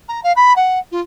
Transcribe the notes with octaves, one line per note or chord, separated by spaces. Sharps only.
A#5
F5
B5
F#5
F4